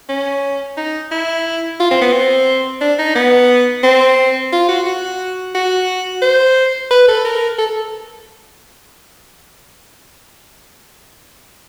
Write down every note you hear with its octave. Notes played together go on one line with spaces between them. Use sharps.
C#4
D#4
E4
F4
C4
B3
C4
D4
D#4
B3
C4
F4
F#4
F#4
F#4
C5
B4
A4
A#4
A4